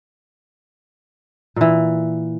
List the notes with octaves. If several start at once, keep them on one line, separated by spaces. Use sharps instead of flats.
A#2 E3